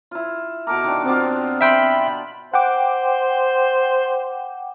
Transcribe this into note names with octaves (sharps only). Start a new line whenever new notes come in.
E4 F4
B2 A4 A#4 D6
D#3 D4
B3 C4 F4
E5 G5 B5 C6
C5 F#5 G5 D6